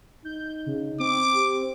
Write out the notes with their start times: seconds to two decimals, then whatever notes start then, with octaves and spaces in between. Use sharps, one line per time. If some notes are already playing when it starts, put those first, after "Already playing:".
0.25 D#4 G6
0.66 C#3
1.00 C4 D6
1.34 G4